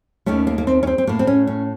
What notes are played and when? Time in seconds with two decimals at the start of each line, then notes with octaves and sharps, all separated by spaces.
0.26 D#2 D#3 A3 C#4
0.47 A#3
0.58 A#3
0.67 C4
0.83 C#4
0.87 C4
0.98 C4
1.07 A2 A3 A#3
1.19 C4
1.27 C#4
1.47 C#4